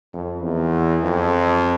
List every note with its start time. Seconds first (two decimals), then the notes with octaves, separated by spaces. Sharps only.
0.14 F2
0.43 E2
1.04 F2